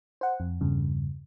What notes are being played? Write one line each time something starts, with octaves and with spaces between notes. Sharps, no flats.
C5 F#5
F2
E2 G2 C#3